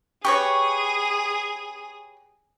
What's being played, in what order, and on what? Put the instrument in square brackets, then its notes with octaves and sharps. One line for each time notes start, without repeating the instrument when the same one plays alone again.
[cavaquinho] G4 B4 C#5 [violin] G#4 [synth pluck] C#6